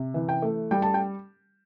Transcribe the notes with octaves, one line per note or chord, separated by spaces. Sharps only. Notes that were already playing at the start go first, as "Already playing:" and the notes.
Already playing: C3
E3
G5
A3
G3 G5
A5
G5